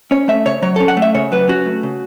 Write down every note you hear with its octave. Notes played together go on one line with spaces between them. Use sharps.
C#4 C#5
A3 E5
C#3 C#5
F#3 C#5
C#4 A4
F#5
A3
E5
C#3 C#5
F#3 B4
C#4 F#4
A3
C#3